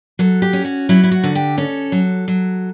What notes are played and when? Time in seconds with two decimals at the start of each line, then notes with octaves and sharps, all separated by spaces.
0.19 F#3 A4
0.42 G4
0.53 C#4
0.65 F#4
0.89 F#3 E4
1.04 E4
1.11 F#4
1.24 D3
1.35 G4
1.58 C#4 A4
1.92 F#3
2.28 F#3